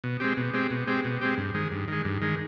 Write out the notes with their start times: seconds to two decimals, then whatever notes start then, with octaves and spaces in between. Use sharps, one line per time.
0.04 B2
0.20 G#3 C4 G4
0.37 B2
0.54 G#3 C4 G4
0.70 B2
0.87 G#3 C4 G4
1.04 B2
1.21 G#3 C4 G4
1.37 G2
1.54 D#3 G#3
1.72 G2
1.88 D#3 G#3
2.05 G2
2.22 D#3 G#3